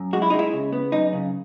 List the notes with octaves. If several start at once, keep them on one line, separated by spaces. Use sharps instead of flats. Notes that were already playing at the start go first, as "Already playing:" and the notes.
Already playing: F#2
G#3 F#4
E4
G#3 D#4
E4
C#3
B3
F#2 D#4
C#3